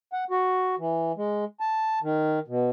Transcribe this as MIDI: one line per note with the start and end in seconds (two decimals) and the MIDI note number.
0.13 0.24 78
0.30 0.75 66
0.78 1.12 52
1.17 1.45 56
1.60 1.99 81
2.03 2.39 51
2.48 2.70 47